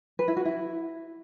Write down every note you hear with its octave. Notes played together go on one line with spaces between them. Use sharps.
B4
E4
F#4
E4